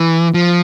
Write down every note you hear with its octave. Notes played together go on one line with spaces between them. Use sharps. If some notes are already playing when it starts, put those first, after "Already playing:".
Already playing: E3
F3